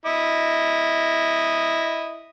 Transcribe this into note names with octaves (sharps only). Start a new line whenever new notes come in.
E4 D#5 D#6